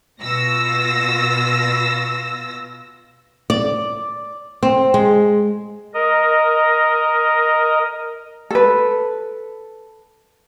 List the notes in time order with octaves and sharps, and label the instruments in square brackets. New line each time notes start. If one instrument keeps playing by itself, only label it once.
[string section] B2 F4 E6 A#6
[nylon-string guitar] D5
C4
G#3
[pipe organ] A#4 D#5
[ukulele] A4 B4